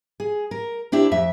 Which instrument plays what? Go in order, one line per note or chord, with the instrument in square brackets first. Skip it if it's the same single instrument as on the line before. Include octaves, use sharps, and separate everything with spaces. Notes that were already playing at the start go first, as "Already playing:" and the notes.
[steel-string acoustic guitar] G#4
A#4
C4 D4 E4 G4
F2 E5